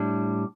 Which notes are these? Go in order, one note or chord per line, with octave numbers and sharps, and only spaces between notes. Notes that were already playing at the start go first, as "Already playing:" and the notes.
Already playing: A2 G3 D4